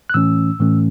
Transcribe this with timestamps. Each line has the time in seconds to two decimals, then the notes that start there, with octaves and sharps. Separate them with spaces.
0.10 F#6
0.14 A2 E3 A3 C#4 E6
0.59 A2 E3 A3 C#4